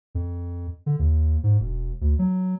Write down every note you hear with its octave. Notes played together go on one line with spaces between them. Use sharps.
F2
D3
D#2
G#2
E1
D2
F#3